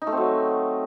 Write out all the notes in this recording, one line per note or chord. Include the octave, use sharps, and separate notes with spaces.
D#4
A3
C4
F#3